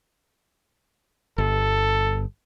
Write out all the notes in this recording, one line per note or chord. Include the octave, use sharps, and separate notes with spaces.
G1 A4